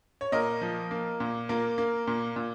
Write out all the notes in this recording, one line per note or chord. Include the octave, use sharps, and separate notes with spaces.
C#5
A#2 A#4 D#5
F3
A#3
A#2
A#3 F4 A#4
A#3
A#2
A#2